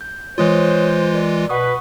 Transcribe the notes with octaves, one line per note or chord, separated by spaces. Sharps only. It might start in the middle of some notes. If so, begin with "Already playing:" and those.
G6
E3 G#3 F4 C5 C#5 D#6 F#6
A#4 D5
B2 B4 F#5 C#6 D#6